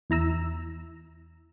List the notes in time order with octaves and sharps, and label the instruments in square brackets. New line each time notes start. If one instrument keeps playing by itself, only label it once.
[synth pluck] E2 E4 A#5 E6